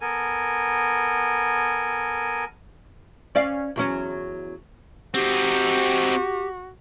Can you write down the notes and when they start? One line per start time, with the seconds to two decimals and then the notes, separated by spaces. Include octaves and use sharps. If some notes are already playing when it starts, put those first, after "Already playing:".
0.01 B3 A4 A#4 G#5
3.35 C#4 D5 F5
3.76 E2 F#3 C#4
5.14 C4 D#4 F#4 G4